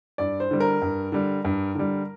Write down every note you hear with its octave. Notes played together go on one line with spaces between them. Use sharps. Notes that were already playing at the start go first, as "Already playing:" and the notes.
G2 D5
C5
D3 G3
A#4
G2
D3 G3
G2
D3 G3